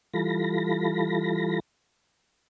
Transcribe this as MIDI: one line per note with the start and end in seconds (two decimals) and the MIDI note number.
0.14 1.60 52
0.14 1.60 55
0.14 1.60 65
0.14 1.60 69
0.14 1.60 83
0.14 1.60 94